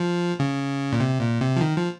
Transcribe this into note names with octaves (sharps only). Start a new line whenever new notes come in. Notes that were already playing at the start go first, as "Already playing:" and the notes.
Already playing: F3
C#3
A#2
C3
A#2
C3
F3
D#3
F3